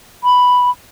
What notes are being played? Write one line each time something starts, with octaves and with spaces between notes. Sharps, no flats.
B5